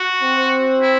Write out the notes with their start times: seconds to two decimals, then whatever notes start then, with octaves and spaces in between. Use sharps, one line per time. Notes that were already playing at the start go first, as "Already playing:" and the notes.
Already playing: F#4
0.22 C4
0.81 E4